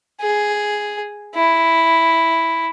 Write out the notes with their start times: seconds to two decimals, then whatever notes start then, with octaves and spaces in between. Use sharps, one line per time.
0.21 G#4
1.35 E4